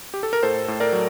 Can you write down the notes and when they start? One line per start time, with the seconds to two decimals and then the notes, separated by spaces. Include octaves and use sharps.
0.14 G4
0.23 A4
0.33 A#4
0.43 A2 A4 C5
0.68 A2
0.80 A#4 D5
0.93 F#3